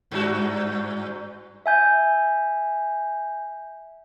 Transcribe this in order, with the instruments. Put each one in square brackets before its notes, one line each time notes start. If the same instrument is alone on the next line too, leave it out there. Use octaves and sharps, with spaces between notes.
[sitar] G2 F#4
[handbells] E5 G#5 G6